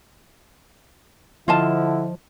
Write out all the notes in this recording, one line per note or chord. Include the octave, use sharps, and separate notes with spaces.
D3 F3 E4 F4 D#5 A5